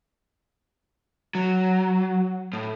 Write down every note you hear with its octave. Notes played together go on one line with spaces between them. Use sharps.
F#3
A2